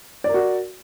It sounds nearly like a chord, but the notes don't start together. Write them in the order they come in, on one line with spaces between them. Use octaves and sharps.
D5 A#4 F#4